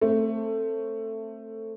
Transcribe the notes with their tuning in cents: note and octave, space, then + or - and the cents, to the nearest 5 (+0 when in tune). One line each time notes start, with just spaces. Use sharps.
A3 +15 C4 +20